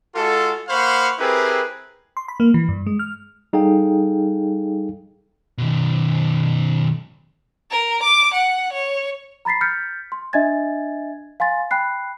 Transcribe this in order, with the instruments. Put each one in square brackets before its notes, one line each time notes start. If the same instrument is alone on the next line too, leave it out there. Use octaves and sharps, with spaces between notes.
[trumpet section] G#3 F4 F#4 A4
A#3 C5 F5 F#5 B5 C#6
C4 E4 G4 G#4 A#4 B4
[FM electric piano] C6
B5
A#3
E3
G2
G#3
F6
[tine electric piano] G3 D#4 G#4 A4 F5 G5
[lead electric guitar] B2 D#3
[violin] A#4
D6
F#5
C#5
[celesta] A#5 B5 A6 B6 C7
F6 G6 A6 B6 C#7
C6
D4 D#5 E5 G#5 G#6 A6
F5 G#5 C6 A6
G5 B5 F#6 C7